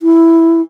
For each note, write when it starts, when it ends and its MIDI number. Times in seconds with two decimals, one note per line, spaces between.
0.02 0.61 64